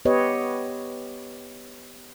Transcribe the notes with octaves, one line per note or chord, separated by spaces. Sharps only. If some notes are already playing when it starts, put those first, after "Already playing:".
B3 G4 B4 C#5 D#5